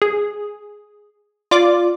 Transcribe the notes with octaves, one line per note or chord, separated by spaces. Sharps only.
G#4
F4 D5 D6